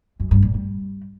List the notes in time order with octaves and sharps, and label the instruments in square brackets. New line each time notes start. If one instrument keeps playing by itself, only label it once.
[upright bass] F#2
G2
A#2
G3